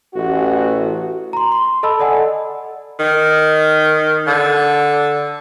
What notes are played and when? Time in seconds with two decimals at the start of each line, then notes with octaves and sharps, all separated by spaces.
0.14 A1 F#4
1.33 A#5 C6
1.52 C6
1.83 A4 D#5 A5 B5 E6
1.99 A4 D5 D#5 F#5 G#5
2.99 D#3
4.27 D3